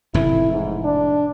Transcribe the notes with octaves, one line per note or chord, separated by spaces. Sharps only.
F1 A2 E3 E4
G#2
D4